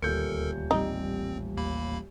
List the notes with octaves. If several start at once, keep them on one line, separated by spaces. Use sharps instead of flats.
D#1 D2 A4 A#4 G6 C#7
A1 G3 C4 D#4
D#2 A#3 B5